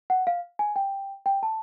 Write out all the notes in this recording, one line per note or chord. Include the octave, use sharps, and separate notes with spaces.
F#5
F5
G#5
G5
G5
A5